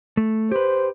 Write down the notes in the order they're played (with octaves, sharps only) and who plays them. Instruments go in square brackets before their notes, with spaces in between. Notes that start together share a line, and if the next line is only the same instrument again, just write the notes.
[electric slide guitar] A3
[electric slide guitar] G4 B4 [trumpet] C5